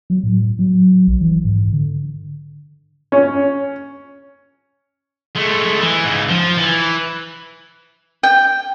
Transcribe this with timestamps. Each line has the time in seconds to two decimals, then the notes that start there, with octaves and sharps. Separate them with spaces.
0.10 F#3
0.24 A2
0.59 F#3
1.07 A#1
1.21 E3
1.45 G#2
1.73 D3
3.12 C#4
5.35 G#3 A3
5.81 E3
6.04 G#2 C#3
6.29 F3
6.58 E3
8.23 G5